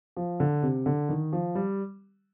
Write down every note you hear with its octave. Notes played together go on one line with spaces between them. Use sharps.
F3
D3
C3
D3
D#3
F3
G3